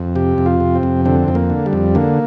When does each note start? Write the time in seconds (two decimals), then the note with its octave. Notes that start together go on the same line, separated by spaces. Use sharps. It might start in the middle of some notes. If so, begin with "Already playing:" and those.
Already playing: F2
0.15 C3 G4
0.38 F2
0.46 F4
0.60 C3
0.75 C4
0.83 F2
1.05 D3 C4
1.28 F2
1.35 A#3
1.50 D3
1.66 G3
1.73 F2
1.95 D3 A#3